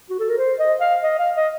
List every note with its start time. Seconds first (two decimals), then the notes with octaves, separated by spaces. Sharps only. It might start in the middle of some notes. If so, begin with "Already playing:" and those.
0.10 F#4
0.19 A4
0.29 A#4
0.38 C5
0.59 D#5
0.81 F5
1.03 D#5
1.19 F5
1.36 D#5